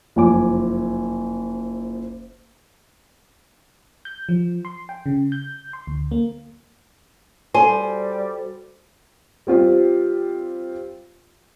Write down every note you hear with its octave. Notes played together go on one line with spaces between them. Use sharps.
F#1 F2 G#5 D6
G6
F3
C6
G5
C#3
G6
C6
D2
A#3
G3 F#4 A4 C5 G#5
G3 C4 F4 G4